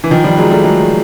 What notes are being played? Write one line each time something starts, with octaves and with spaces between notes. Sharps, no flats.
E3
D#3 F3
F3 G3
F#3 G#3
G3 A3
F#3 G#3